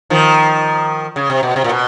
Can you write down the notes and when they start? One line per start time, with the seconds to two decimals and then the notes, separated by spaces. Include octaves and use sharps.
0.10 D#3 F3
1.16 C#3
1.30 C3
1.43 B2
1.56 C3
1.64 A#2
1.69 B2